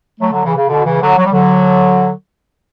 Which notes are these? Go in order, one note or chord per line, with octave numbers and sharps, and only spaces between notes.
F#3 A3
D3 F#3
C#3 E3
C#3
B2 D3
C#3 E3
D3 F#3
F#3
G3
D3 F#3